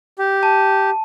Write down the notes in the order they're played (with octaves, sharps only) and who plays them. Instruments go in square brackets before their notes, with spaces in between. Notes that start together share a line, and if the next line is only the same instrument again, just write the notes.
[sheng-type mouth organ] G4
[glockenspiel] A5